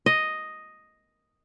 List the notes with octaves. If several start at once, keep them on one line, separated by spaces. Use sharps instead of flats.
D#5